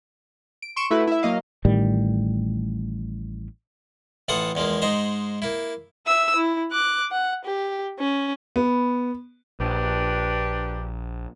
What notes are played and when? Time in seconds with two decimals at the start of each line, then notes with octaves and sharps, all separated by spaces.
0.62 D7
0.76 C6 C#6 D7 E7
0.91 A3 E4 F#4 B4 E5
1.07 E4 E5
1.23 F#3 A#3 D#5 F5
1.65 A1 A2 D#3 G3
4.28 A1 E3 F4 A4 F#5 D#6
4.55 E2 F3 G#3 A#3
4.82 G#2 G#3 D#4 C5 A#5
5.42 A#3 E4
6.07 E5 E6
6.36 E4
6.72 D6 F#6
7.12 F#5
7.45 G4
7.99 C#4
8.56 B3
9.60 A#1 D4 G4 B4